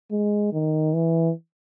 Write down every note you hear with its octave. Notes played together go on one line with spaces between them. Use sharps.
G#3
D#3
E3